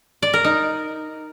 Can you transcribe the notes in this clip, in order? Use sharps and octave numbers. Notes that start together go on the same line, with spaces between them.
D5
A#4
D#4